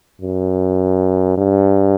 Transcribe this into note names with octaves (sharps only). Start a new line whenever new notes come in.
F#2
G2